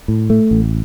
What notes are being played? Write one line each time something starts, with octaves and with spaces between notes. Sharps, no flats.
A2
A3
A1